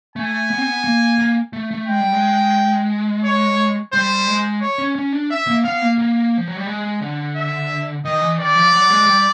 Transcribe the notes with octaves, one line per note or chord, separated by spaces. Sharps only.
A3 G#5
B3
C4
B3
A#3
A#3
A3
A3
G#3 G5
G3
G#3
C#5
G3 C5
G#3
C#5
C#4
C#4
D4
E5
A#3
B3 F5
A#3
A#3
F3
F#3
G3
G#3
D3
E5
D#3 D#5
E3
D#3 D5
F3
F#3
G#3
G3